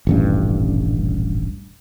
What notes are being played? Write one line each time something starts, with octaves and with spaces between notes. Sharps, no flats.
D#1 A1 G2